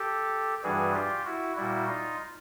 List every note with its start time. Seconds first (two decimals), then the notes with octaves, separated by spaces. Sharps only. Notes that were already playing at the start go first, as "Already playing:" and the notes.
Already playing: G4 A4
0.64 G2 E3 G3 F#4 G#4
0.95 F4 G4
1.25 E4 F#4
1.57 A#2 G3 E4 F#4
1.88 D#4 F4